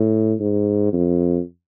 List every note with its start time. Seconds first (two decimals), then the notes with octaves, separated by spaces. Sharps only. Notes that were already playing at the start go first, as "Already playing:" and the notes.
Already playing: A2
0.40 G#2
0.93 F2